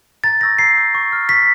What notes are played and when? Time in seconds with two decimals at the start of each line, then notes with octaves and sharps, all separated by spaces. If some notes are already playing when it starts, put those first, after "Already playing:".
0.24 A#5 A6
0.41 C#6 E6 G6 A#6
0.59 A#5 C7
0.77 C#6 E6 G6
0.95 C#6
1.12 F6
1.29 C#6 B6